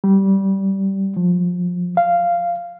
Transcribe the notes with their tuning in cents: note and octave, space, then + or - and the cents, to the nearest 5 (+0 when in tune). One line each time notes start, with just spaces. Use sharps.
G3 -15
F3 +25
F5 -10